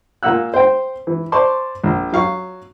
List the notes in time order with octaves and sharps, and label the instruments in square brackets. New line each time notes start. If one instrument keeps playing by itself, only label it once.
[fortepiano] A#2 A#3 F#5 E6 F#6
C5 G5
E3
C5 D5 A5 C6 C#6
A#1
F#3 F5 C#6